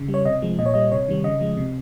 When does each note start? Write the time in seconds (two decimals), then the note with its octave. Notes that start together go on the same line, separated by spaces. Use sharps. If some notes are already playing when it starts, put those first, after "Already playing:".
Already playing: C#3
0.09 G3
0.14 C#5
0.25 C3 D#5
0.42 F3 G#3
0.59 A#2 D#5
0.66 C#5
0.74 G3 D#5
0.92 C3 C#5
1.08 D#3 G3
1.24 C#3 D#5
1.41 F3 G#3
1.57 C3